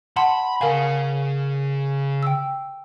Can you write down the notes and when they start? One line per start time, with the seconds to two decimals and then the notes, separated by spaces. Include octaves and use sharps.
0.16 F#5 A5 B5 C6
0.61 C#3 A#4 F5 G#5
2.23 G5 E6